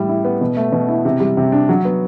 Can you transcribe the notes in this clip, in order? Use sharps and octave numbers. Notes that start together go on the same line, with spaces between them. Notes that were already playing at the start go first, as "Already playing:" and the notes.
Already playing: A2 G3
E4
B3
B2
A3
B2
E4
C3
G3
C3
D4
F#3
B3